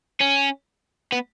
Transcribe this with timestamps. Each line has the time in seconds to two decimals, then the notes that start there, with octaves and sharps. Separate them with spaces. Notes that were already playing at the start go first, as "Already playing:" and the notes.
0.21 C#4
1.12 B3